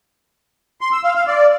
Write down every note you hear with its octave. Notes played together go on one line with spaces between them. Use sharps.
C6
E6
F5
F5
D5